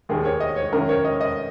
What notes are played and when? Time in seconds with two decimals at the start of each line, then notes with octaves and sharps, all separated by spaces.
0.09 D#2 D#3 G#4
0.25 C#5
0.40 D#5
0.56 C#5
0.72 F#2 D#3 A#4
0.89 C#5
1.04 D#5
1.21 D#5